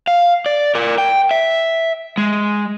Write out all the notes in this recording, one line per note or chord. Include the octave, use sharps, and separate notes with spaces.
F5
D5
A#4 D5
G5
E5
G#3